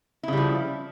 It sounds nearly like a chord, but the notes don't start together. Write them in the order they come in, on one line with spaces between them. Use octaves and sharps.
E4 C#3 G3 F3